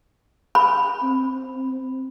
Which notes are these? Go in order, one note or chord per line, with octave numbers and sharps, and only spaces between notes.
B5
C4